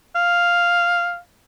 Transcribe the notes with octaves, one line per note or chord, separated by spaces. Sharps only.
F5